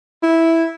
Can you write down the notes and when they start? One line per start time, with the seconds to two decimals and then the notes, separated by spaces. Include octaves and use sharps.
0.23 E4